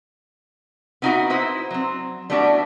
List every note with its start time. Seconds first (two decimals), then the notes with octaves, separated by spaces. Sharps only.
1.02 B3 C4 D#4 E4 F#4 D#5
1.30 D#4 E4 B4 C5
1.71 F#3 C4
2.30 G3 A3 B3 D4 E4 F#4